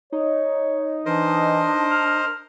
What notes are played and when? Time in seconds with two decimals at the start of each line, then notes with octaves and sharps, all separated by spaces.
0.12 D#4 C#5
1.06 E3 D4 A#4 C5 D#5
1.91 F6